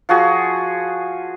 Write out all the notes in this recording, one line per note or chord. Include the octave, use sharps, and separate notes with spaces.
F3 F#4 G#4